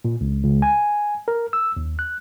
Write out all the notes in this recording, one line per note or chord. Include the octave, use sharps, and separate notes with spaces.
A#2
C#2
C#2
G#5
A#4
E6
D#2
F#6